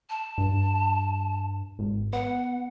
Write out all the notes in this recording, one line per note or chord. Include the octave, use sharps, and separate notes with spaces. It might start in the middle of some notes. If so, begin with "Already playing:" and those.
A5
G2
G#1
B3 F#5